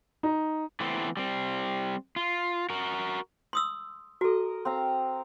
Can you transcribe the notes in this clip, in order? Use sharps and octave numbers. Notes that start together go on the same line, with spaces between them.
D#4
E3 A3 B3 C4
G3 C4
F4
F#4 A#4
C6 D#6 E6
F#4 A4 A#4 D#5
C4 F5 A#5